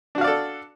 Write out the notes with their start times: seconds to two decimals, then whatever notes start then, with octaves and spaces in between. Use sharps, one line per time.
0.15 D4
0.18 F#4
0.21 F5
0.24 D5
0.27 A4